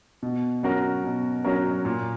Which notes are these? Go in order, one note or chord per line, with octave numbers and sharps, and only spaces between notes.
B2
F#3 C#4 F#4 A#4
B2
F#3 C#4 F#4 A#4
A#2